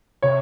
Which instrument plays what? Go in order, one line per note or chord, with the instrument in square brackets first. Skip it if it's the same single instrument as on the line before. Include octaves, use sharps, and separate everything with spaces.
[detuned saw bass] C3 [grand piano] C#5